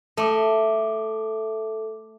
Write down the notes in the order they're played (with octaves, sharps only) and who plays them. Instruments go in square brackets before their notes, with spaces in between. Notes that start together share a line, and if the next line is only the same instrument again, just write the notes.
[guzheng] A3 [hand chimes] A4 D6